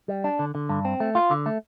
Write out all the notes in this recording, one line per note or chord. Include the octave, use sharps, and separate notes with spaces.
G3
D4
D3
D3
G2
C4
A3
F4
D3
A3